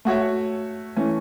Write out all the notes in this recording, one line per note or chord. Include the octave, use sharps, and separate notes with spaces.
A3 F#4 C#5 E5
E3 A3 C#4